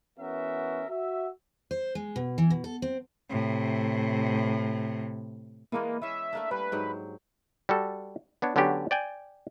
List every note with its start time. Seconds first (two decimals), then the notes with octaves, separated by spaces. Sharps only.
0.19 E3 B3 C#4 F#4 A#4 E5
0.89 F#4 E5
1.71 C5
1.95 G#3
2.16 B2
2.38 E3
2.50 B2
2.64 A4
2.82 C4
3.30 A2 C3
5.72 E3 G#3 A#3 B3
6.02 E3 C#4 E5
6.33 A3 A#3 D4
6.51 G3 B4
6.72 G#2 F#3 G4
7.69 G3 F#4 A4
8.42 B3 D4 C#5
8.56 D3 F#3 B3 C#4 D4 G4
8.91 D5 G5 G#5